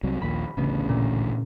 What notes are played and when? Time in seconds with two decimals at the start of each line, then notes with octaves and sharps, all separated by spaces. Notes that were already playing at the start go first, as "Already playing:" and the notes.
0.03 C2 C3 F#3
0.22 A#1 D#2 A#2 B5
0.57 A1 D2 C#3 B3
0.89 A#2